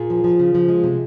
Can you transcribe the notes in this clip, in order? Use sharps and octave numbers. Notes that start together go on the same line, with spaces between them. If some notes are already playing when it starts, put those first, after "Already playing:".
Already playing: A#2 F4 G#4
F3
F3
C#3
F3
G#3
C3